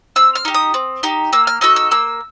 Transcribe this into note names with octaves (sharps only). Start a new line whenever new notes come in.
C4 E6
F6
D#4 G4
D#6
C4
D#4 G4
A#3 E6
F6
D#4 F#4 A4 E6
E6
A#3 E6